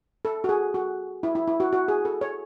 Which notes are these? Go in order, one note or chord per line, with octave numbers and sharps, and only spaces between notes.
A4
F#4
G#4
F#4
E4
E4
E4
F#4
F#4
G#4
A4
C#5